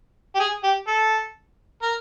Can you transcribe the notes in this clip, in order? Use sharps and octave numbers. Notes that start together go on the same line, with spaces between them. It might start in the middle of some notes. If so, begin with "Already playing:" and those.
G4
G#4
G4
A4
A#4